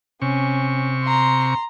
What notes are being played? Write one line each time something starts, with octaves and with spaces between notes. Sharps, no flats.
C3 C#4 C#6
A#5 C6